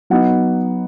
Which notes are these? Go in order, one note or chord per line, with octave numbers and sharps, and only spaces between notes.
F#3 B3 D#4 F#5